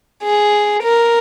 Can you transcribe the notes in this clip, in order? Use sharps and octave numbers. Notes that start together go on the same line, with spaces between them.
G#4
A#4